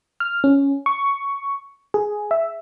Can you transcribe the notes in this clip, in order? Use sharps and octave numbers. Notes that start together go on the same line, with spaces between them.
F6
C#4
C#6
G#4
E5